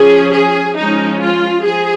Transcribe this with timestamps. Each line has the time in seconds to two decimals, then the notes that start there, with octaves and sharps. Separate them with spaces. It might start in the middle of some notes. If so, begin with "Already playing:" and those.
Already playing: F3 C#4 G#4
0.33 G#4
0.77 F3 G#3 C#4 D#4
1.21 F4
1.64 F3 G#4